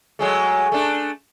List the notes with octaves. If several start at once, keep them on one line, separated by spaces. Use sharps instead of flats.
F#3 G#3 A3
A3 D4